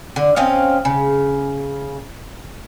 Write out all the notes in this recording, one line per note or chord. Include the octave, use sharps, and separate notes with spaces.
D3
C4 C#4 D#5 F5
C#3